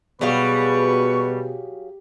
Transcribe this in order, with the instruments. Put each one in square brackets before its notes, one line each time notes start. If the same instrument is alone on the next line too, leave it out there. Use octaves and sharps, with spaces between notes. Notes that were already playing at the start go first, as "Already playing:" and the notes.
[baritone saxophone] B2 [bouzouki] F#3 G#4 F5 [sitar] G3 [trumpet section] B4 C#6